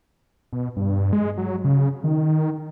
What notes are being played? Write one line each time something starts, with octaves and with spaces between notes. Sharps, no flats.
B2
G2
G#3
F#3
C#3
D#3